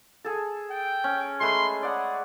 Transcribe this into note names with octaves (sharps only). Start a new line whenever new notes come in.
G#4 A4
G5
C#4
G#3 A3 B4 C6
G#4 D5 F#5